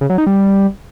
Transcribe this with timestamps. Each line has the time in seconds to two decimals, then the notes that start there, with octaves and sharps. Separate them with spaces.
0.01 C#3
0.10 F#3
0.18 D#4
0.27 G3